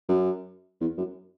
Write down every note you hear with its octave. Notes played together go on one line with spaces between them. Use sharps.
F#2
E2
F#2